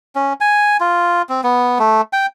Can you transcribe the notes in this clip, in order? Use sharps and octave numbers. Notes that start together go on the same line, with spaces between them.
C#4
G#5
F4
C4
B3
A3
G5